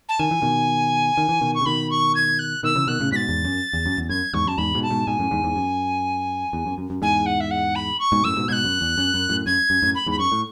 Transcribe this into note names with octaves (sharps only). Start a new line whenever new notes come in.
A5
D#3 G#5
E3
B2 D#3
D#3
E3
B2 D#3
C#6
C#3
B2 D#3 B5
C#6
G#6
F#6
B2 D#3 E6
C#3 E3
B2 D#3 F#6
A2 C#3
G#2 B2 A6 B6
E2 G#2
F#2
E2
F#2
E2
F#2 G#6
E2 G#2 C#6
F#2 A5
E2 G#2 B5
G#2 B2
A5
G#2 B2
G#2 B2 G#5
F#2 A2
E2 G#2
E2 G#2
F#2
E2
F#2
F#2
F#2
E2 G#2 G#5
F#5
E5
F#5
B5
C#6
G#2 B2
F#2 A2 E6
G#2 B2
G#2 B2 F#6 G#6
F#2
E2
F#2
F#2
F#2 A2
F#2 G#6
F#2
F#2 A2
B5
E2 G#2 B5
F#2 C#6
A2